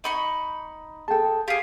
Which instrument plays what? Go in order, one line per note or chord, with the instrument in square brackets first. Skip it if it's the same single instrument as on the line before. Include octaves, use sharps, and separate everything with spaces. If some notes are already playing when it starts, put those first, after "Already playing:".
[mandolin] D#4 B5 C#6
[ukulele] G#4 A4 [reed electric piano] G5 A5
[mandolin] G4 G#4 [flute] F5